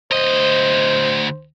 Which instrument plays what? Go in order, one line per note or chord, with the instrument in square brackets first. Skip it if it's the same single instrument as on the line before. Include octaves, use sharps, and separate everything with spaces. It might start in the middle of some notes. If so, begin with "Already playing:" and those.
[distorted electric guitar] D2 D#5 [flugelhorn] C5